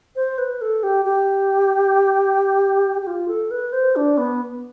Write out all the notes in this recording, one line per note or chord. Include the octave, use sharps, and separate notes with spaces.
C5
B4
A4
G4
G4
G4
F4
A4
B4
C5
D4
B3